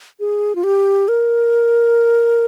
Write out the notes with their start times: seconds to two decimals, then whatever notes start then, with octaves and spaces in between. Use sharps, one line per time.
0.20 G#4
0.55 F4
0.64 G4
1.08 A#4